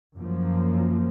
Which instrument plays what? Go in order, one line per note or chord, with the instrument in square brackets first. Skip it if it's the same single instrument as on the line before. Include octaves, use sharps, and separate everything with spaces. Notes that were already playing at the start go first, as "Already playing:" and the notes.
[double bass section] F#2 F3 A#3